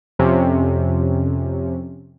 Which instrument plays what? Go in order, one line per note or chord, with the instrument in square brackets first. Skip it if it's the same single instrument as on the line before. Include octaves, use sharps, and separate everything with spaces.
[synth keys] F2 C3 C#4